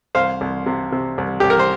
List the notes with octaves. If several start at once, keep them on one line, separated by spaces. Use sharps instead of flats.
C2 C5 F5
C2
C3
C3
C2
C2 G4
A#4
C5